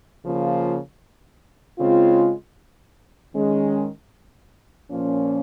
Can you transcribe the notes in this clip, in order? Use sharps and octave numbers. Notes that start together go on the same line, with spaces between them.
C#3 F3 A#3 F4
C#3 G#3 C4 F4
D#3 G#3 C#4
A#2 F3 A#3 C#4